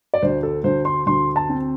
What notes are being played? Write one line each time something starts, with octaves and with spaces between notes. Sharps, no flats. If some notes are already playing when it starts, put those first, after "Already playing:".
D5
D2 C5
A4
D2 C5
C6
D2 C6
A5
C4